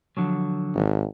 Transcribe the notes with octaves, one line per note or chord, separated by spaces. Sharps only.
D3 F3 F#3
G#1